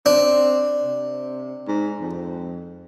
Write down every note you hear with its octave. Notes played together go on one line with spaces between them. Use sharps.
C4 D4
C3
G#2
F2